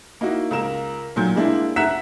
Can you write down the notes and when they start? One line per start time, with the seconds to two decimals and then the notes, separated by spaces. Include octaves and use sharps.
0.21 A#3 D#4 E4 F#4
0.51 C#2 A#4 E7
1.16 B1 A#2 F#3 G6
1.35 G3 G#3 A#3 D4 E4
1.76 E5 F#5 A#5 F#6 B6 E7